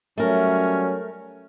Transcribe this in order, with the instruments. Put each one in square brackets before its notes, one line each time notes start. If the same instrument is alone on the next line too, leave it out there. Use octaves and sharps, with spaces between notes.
[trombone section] F#3 G3 C#4 [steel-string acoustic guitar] A3 A#4